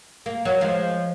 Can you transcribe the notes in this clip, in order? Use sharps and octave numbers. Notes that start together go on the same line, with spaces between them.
A#3
F#3 A#3
F3 G#3